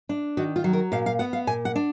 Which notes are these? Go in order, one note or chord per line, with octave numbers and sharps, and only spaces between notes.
D4
D#3 F#4
F4
F#3
A#4
A#2 F5
F5
B3 F#5
F5
A#2 G#5
F#5
D4